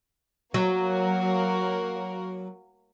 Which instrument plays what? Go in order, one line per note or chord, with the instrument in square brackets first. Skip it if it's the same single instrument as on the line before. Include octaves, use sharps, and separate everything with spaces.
[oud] F#3 [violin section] A#3 F#4 A#4